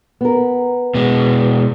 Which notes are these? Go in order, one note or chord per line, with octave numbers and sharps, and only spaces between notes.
B3 A#4
B2 G#3